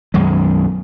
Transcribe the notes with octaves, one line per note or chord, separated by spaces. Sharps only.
B1 F#2 D#3 G#3